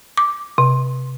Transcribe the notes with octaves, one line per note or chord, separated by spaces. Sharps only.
D6
C3